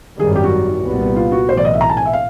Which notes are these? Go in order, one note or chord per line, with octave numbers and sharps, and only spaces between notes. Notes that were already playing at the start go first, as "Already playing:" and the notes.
G#1 F#2 D#3 G3 G#4
G4
F#4
C2 A#2 G3 B3
F4
F#4
B1 A2 E3 C5
D5
D#5
E5
A#5
A5
G#5
E5
F5